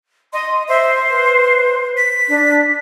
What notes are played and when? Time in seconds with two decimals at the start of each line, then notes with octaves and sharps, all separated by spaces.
0.33 D#5 C6
0.68 C5 E5
1.10 B4
1.97 B6
2.29 D4